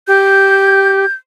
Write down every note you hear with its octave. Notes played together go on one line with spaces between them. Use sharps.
G4 G6